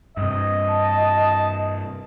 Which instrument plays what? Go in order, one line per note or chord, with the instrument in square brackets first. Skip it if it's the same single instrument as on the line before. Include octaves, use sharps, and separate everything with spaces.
[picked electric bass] G2 C3 [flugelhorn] D#5
[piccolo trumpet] A5